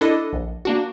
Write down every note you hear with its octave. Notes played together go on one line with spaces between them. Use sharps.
D4 E4 A4 D#5
A#1
A#3 D4 F#4